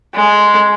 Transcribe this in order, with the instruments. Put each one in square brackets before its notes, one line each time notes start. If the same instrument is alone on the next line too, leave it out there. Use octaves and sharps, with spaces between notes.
[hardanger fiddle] G#3